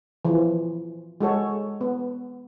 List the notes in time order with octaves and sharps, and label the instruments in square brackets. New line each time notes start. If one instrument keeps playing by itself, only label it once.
[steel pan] E3 F3
G#3 F#4 A4 C#5
B3